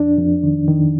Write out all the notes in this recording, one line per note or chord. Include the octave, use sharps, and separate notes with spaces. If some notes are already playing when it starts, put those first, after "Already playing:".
Already playing: F2 D4
F2
D#3
D#3